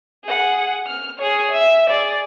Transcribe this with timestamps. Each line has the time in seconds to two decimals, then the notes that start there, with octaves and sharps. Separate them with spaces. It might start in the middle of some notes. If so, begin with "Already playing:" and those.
0.25 G#4 F#5
0.86 F6
1.17 G#4 C#5
1.51 E5
1.89 G#4 D5